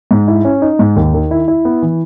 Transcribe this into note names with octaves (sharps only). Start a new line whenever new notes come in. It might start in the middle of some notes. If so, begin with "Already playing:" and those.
G#2
E4
C#4
D#4
G#2
D#2
D#3
E4
E4
B3
E3